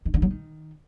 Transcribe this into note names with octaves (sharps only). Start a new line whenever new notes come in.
D#3
D3
F#3
D#3